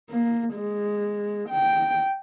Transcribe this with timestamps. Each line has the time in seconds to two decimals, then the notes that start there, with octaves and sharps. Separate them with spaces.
0.10 A#3
0.54 G#3
1.49 G5